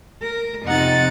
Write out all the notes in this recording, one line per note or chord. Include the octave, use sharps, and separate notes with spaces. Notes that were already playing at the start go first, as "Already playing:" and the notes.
A#4
F2 C3 D#4 F#5 A#5 A6